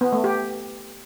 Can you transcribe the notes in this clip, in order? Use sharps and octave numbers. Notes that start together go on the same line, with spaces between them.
B3
A3
G4